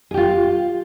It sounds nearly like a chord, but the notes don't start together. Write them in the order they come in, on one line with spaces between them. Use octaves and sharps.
G#4 G4 F4